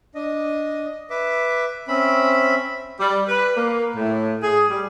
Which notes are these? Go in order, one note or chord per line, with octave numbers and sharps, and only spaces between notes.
D4 D#5
B4 E5 D6
C4 C#4 E5 B5
G3
B4
A#3
A2
G#4
G3